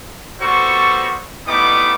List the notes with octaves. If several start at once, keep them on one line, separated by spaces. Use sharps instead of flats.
G3 B3 F#4 A4 C5 C#6
G3 A3 B3 D#4 E4 D6